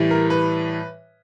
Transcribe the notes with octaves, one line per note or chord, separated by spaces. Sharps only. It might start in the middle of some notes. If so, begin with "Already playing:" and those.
Already playing: A2 E3 G3
A#4
B4